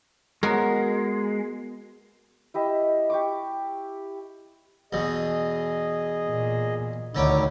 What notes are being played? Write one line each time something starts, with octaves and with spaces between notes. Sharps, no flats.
G#3 B3 F#4 A#4
E4 G4 D#5 E5
G4 C#6 D6
E2 B2 G#4 D#5
A#2
D2 A2 D3 D#3 C#4 D#4 E4 D6